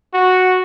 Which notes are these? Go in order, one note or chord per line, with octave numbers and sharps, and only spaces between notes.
F#4